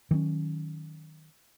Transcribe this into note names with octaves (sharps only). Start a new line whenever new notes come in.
D#3 F#3 C4 C#4